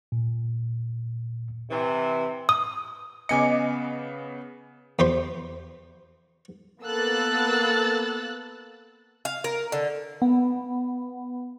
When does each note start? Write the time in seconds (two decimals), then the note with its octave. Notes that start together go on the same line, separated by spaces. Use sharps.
0.12 A#2
1.70 C3 E3
2.49 D#6
3.29 C#3 B3 D#5 G#5 D6 C#7
4.99 E2 G4 C5 C6
6.82 A#3 B3 A4 E6 F#6 A6
9.25 F5
9.44 A#4
9.72 D3
10.22 B3